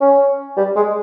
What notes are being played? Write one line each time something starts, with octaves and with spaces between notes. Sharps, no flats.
C#4
G3
G#3